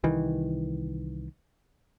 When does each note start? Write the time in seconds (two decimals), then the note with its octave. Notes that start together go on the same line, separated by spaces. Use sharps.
0.04 C2 D#3 E3